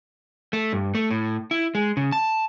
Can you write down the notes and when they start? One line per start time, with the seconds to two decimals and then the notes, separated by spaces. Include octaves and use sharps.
0.53 A3
0.73 G2
0.95 A3
1.10 A2
1.51 E4
1.75 G#3
1.97 C#3
2.12 A5